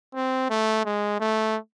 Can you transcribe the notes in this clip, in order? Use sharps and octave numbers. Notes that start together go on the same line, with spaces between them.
C4
A3
G#3
A3